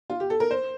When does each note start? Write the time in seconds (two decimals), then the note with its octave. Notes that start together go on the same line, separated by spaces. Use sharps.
0.10 F4
0.20 G4
0.30 A4
0.40 A#4
0.51 C5